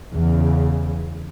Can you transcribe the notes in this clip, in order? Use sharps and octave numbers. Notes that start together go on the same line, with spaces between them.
E2 C#3